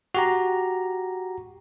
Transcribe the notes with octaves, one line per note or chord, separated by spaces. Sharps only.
F#4 G4 A#5